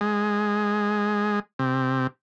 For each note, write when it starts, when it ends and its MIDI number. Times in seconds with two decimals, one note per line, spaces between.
0.01 1.39 56
1.59 2.07 48